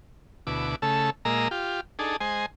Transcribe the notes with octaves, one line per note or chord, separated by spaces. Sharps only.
D2 B2 E4 D6
C#3 A3 A4 E6
A#2 G#3 A#3 D#5 A#5 E6
F4 G4
D4 D#4 G#4 A4
G#3 C5 D#5 G#5